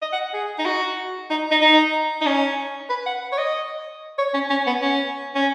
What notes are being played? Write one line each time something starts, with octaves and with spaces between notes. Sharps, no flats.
D#5
F#5
G#4
D#4
F#4
D#4
D#4
D#4
D#4
C#4
B4
F#5
C#5
D#5
C#5
C#4
C#4
B3
C#4
C#4